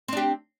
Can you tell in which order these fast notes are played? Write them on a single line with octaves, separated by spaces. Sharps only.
C4 D4 G4